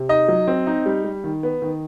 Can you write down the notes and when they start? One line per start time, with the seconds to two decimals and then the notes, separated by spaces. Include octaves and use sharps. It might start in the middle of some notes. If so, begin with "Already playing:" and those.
Already playing: C3
0.09 D#4 D#5
0.28 F#3
0.48 C4
0.67 D#4
0.86 G3
1.04 G3
1.24 D#3
1.43 B3
1.62 D#3